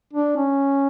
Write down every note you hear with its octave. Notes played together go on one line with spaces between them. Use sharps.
D4
C#4